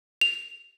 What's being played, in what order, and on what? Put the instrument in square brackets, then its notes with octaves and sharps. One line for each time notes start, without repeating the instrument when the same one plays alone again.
[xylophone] F7